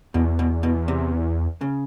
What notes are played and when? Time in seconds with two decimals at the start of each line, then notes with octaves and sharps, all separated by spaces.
0.14 E2 B2
0.39 B2
0.63 B2
0.88 C3
1.61 C#3